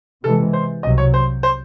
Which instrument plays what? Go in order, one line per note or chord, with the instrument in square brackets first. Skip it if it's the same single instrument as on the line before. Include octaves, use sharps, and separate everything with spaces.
[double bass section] C3 E3 G#3 [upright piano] A4
[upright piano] C5
[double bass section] C2 C3 F#3 [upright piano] D#5
[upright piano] C#5
C5
C5